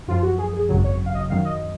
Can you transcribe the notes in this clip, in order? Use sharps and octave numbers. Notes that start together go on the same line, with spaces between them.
F#2 F3 F4
F#4
G#4
G#4
G#1 F#2 C#3 F#3
C#5
F5
D#5
F#2 D#3 F#3 F5
D#5